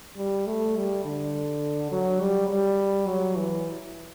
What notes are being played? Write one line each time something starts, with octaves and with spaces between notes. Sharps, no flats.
G3
A3
G3
D3
F#3
G3
G3
F#3
E3